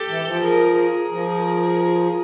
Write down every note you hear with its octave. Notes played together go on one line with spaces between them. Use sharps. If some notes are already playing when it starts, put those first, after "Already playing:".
Already playing: G4 A4
E3
F3
G#4 A#4
G#4 A#4
F3